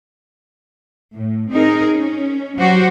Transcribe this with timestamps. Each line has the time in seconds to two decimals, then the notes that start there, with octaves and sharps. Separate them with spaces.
1.15 A2
1.51 C4 D#4 G#4 A#4
1.92 C#4
2.59 F#3 F#4 G4 C5